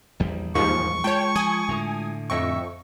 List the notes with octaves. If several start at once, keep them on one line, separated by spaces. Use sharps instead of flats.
A#1 E2 G3
D#2 G#2 F3 C#6
G#3 F4 C#5 G5 A5
F3 G#5 D#6
A2 D3
F2 D#5 E5 G5 C#6